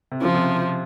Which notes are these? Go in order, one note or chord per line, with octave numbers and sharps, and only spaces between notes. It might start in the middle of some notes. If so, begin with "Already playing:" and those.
C3
C#3 F3
C3